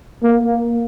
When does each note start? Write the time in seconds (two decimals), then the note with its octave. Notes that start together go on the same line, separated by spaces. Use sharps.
0.23 A#3